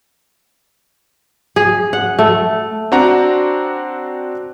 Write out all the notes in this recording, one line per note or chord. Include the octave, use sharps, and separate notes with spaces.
G#4
F#5
A3
C4 D4 F#4 F#5 A#5